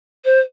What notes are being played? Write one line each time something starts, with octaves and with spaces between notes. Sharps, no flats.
C5